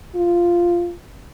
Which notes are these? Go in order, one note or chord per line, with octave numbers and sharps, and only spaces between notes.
F4